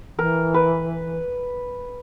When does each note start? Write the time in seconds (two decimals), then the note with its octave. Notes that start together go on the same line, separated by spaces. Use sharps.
0.18 E3 A#4
0.54 B4